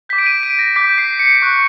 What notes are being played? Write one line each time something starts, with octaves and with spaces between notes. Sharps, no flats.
D6 G6 B6
D7
D#7
D7
A#6
D6 G6 B6
C7
C#7
C#6 F#6